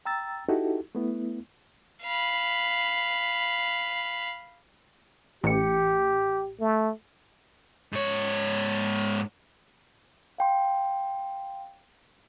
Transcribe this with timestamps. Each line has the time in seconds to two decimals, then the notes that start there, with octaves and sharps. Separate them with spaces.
0.05 G5 A#5 E6 A6
0.49 D#4 E4 F#4 G4 A4
0.95 A3 B3 E4
2.03 F5 B5
5.44 A1 G4 C#7
6.60 A3
7.93 G#2 C#5
10.38 F5 G5 C6